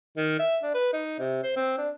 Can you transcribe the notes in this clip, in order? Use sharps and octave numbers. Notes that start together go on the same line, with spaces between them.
D#3
E5
D4
B4
D#4
C3
C5
C4
D4